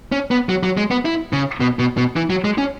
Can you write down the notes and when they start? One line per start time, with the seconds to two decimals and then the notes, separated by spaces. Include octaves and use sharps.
0.12 C#4
0.31 B3
0.49 F#3
0.63 F#3
0.77 G#3
0.91 B3
1.05 E4
1.33 C#3
1.60 B2
1.79 B2
1.97 B2
2.16 E3
2.30 F#3
2.44 G#3
2.58 C#4